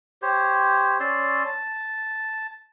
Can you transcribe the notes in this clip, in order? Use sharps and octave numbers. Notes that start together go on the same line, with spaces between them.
G4 C5 C#5
C#4 D5 C6 E6
A5